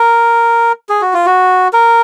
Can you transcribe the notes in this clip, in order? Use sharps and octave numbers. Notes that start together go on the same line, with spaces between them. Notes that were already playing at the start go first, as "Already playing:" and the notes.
Already playing: A#4
G#4
F#4
F4
F#4
A#4